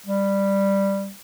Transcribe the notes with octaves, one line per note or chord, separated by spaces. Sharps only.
G3